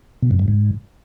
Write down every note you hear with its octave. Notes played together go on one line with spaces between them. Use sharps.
B2
F#2
G2
G#2